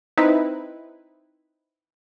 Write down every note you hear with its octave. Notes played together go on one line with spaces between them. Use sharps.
C4 D#4 E4 B4